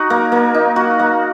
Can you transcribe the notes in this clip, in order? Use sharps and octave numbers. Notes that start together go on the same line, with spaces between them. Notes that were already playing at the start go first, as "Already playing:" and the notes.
Already playing: D#4 F#4
A#3
A#3
D#4
F#4
A#3